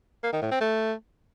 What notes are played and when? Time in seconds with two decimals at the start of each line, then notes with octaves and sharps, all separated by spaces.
0.23 A#3
0.33 D#3
0.42 A2
0.51 C4
0.61 A3